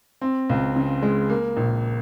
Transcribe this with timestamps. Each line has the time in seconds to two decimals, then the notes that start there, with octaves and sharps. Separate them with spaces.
0.21 C4
0.49 C#2
0.76 C#3
1.02 G#3
1.30 A#3
1.57 A#1